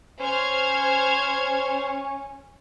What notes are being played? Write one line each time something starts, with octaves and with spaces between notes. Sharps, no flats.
C#4 C5 F6 G#6